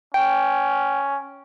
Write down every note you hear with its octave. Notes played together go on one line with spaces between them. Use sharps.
C#4 G5